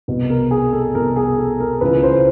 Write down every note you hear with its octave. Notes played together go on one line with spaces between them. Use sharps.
C2 B2
A#4
G#4
A4
C2 B2 A#4
G#4
A4
A#4
C#2 C#3 E3 B4
C5